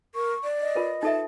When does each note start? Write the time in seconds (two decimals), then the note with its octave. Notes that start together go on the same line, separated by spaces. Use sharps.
0.15 A#4 C#6
0.44 D5
0.61 D#5
0.75 F4 A#4 B4
1.03 D#4 A4 E5 A5